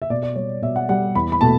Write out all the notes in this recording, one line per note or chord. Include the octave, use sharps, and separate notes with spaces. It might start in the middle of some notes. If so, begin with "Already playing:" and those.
E5
B2 D5
D5
G3 C#5
B2 E5
F#5
G3 F#5
E2 B5
B5
B2 A3 A5